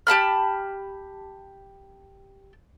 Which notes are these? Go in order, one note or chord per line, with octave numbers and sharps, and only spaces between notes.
G4 A5 B5 F6